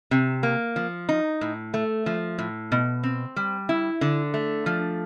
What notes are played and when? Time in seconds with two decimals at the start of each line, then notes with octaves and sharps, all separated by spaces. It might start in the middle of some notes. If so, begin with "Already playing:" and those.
0.11 C3
0.43 A#3
0.76 F3
1.09 D#4
1.41 A2
1.74 A3
2.06 F3
2.38 A2
2.72 B2
3.03 C4
3.36 G3
3.69 E4
4.01 D3
4.34 A3
4.66 F3